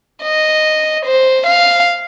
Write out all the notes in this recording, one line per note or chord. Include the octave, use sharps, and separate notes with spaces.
D#5
C5
F5